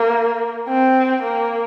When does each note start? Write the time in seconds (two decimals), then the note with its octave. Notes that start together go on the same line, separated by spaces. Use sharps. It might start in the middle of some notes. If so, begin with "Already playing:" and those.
Already playing: A#3
0.69 C4
1.22 A#3